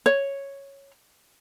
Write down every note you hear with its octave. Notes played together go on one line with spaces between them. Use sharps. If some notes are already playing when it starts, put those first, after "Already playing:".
C#5